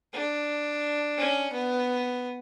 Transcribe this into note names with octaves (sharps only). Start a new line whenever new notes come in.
D4
C#4
B3